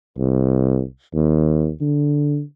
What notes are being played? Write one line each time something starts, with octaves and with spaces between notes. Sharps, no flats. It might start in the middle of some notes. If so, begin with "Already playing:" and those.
C2
D#2
D3